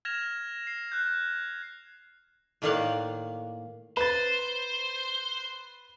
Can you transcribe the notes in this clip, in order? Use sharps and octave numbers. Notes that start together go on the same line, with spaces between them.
F6 G#6 A#6 E7 F7
C7
F#6 G6
A2 D#3 A#3 D5 F5 F#5
B4 C5 A6